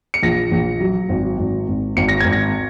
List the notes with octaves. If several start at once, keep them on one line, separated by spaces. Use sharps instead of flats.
C#7
A#1 A#6
A#1
F#3
G#1
G#1
G#1
G#1 C#7
A#6
G#1 G#6
A#6